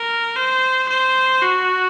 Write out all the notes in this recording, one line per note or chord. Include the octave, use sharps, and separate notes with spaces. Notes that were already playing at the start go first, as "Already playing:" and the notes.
Already playing: A#4
C5
C5
F#4